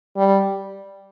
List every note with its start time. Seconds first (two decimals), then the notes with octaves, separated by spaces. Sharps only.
0.17 G3